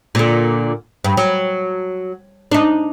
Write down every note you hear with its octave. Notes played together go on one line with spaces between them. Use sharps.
A#2 D3
G2
F#3
D4 D#4